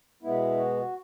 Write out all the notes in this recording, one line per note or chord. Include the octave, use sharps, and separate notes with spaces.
B2 G#3 B3 E4
F#4